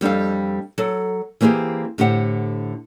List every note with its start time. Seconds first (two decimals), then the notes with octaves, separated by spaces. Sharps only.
0.01 F2 G3 D4 A4 F5
0.78 F#3 A4
1.41 E3 A#3 C4 G4 G#4
1.98 A2 D3 G4 C5 F#5